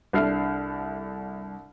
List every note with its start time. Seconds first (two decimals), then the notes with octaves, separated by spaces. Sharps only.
0.13 C2 D4 A4 E5 F6 C7